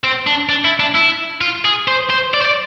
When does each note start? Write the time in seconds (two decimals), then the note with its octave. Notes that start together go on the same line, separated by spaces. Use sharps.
0.04 C4
0.27 D4
0.49 D4
0.65 E4
0.80 D4
0.95 E4
1.41 F4
1.65 G#4
1.88 C5
2.10 C5
2.34 D5
2.41 C5
2.45 D5